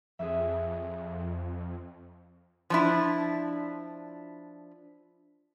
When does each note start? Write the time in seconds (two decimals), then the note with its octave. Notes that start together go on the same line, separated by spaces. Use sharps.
0.19 F2 G#4 E5
2.70 F3 D4 E4